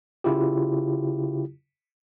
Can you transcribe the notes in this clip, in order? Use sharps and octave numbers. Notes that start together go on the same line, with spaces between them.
C#3 E4 F4 G4